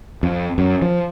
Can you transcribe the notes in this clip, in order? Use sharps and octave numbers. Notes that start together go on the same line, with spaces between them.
F2
F#2
F3